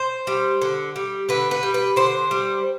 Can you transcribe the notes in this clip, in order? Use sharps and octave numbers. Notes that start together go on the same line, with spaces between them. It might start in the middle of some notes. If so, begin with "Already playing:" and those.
Already playing: C5
G3
D3
G3
D3 B4
B4
G3
B4
D3 C5
G3